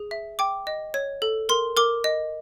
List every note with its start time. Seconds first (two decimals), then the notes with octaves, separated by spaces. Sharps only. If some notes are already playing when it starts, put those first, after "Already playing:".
Already playing: G#4
0.11 E5
0.39 G5 D6
0.67 D#5
0.94 C#5
1.22 A4
1.49 A#4 C6
1.77 A#4 D6
2.04 D#5